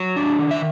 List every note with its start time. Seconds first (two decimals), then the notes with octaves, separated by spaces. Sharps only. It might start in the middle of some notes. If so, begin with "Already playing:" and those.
Already playing: F#3
0.16 D4
0.39 D#3
0.51 E5